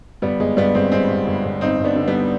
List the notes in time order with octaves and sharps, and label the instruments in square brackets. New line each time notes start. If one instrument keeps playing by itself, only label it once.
[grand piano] G1 G3 B3
G1 G#3
G2 G3 B3
G1 G#3 C4
G2 G#3 C4
G2
G1
G1
G2 C4 D#4
G2
B3 D4
D3
G3 B3